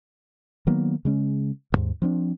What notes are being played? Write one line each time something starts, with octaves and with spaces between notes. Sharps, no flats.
D#3 F#3 A#3 B3
C#3 G#3 C#4
A1 D#2 G#2
F3 C4 D4